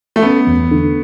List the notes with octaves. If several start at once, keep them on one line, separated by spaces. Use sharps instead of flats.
A3
B3 C#4
E2
D3